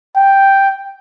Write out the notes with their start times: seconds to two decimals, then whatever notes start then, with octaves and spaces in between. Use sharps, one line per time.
0.16 G5